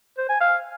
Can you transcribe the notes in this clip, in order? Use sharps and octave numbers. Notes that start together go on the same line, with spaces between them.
C5
G#5
F5